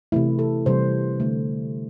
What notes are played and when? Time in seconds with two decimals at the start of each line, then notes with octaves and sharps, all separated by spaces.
0.12 C3 E3 A3 E4
0.39 A4
0.66 C3 E3 G3 C5
1.20 D3 A3